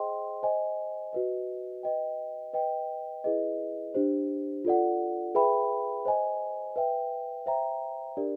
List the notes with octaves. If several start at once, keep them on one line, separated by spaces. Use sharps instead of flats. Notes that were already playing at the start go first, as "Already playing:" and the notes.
Already playing: G#4 C5 D#5 G5 C6
C5 D#5 G#5
F#4 B4 D#5
B4 D#5 G5
B4 D#5 G5
E4 G#4 B4 D#5
D4 G4 C5
F4 A4 D5 F#5
G#4 B4 E5 G5 B5
C5 D#5 G#5
B4 E5 G5
C5 E5 G5 A#5
D4 G4 A#4 D5